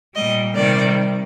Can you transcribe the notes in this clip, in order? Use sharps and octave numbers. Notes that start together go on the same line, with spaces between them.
A#2 G3 D#5
C3 D#3 G3 D5